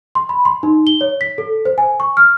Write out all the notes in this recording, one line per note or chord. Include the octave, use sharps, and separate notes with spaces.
C6
B5
C6
D#4
G7
C#5
B6
A4
C5
G#5
C#6
F6